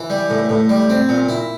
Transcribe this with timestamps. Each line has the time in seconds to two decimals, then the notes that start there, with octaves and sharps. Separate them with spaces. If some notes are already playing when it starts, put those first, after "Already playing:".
Already playing: E3
0.10 G3
0.30 A2
0.49 A2
0.69 G3
0.90 C4
1.09 A#2
1.29 E4